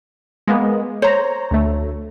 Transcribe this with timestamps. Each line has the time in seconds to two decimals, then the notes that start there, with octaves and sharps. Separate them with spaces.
0.48 G#3 A#3 B3
1.02 C5 C#5 A#5
1.51 D2 A3